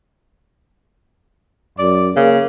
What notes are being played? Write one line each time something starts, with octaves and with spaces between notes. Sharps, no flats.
F#2 D5
C#3 A#3